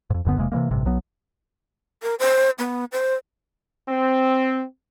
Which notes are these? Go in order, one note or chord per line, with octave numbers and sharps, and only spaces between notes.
F2 G#2
D#1 F#2 D3 B3
E1 C3 G#3 A#3
C3 E3 G#3 A#3
A1 G2 C3
B1 F#3 B3
A#4
C5
B3
C5
C4